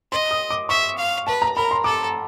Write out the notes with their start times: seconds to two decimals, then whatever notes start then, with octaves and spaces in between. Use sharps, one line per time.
0.12 D#5 C6
0.31 D#6
0.50 D6
0.69 E5 C#6
0.98 F5
1.27 B4 A5
1.42 A#5
1.56 A#4 B5
1.71 C6
1.84 A4 D6